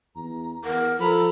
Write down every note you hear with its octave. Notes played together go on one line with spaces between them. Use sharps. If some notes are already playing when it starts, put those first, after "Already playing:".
E2 A#5
E2 A#4 F#5
F3 A4 A#5 B5